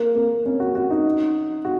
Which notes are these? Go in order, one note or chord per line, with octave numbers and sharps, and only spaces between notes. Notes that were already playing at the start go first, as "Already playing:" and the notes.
Already playing: A#3
A#3
C#4
F#4
F#4
D#4
F#4